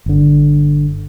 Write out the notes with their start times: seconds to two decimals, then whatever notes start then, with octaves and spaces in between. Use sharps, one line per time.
0.06 G1 D3